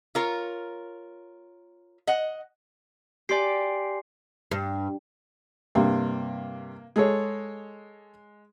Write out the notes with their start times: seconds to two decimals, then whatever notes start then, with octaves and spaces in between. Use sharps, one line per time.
0.15 F4 A#4 C#5
2.07 D#5 F#5
3.29 G4 D5 G#5 C6 C7
4.51 G2
5.75 G2 C3 A#3
6.96 G#3 G#4 A4 C#5